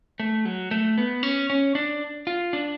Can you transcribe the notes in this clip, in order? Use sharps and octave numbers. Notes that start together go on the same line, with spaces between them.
A3
F#3
A3
B3
C#4
C#4
D4
F4
D4